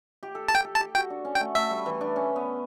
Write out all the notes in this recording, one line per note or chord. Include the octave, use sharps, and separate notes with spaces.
G4
A4
G4 A5
G5
A4
A5
G4
F#4 G5
D4
C#4
G5
A3
A3 E5
G3
E3
D4
C#4
B3